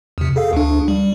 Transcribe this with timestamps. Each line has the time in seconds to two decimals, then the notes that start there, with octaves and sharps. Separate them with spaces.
0.18 E2 C3
0.36 G#4 A4 F5
0.53 D2 D4
0.88 G3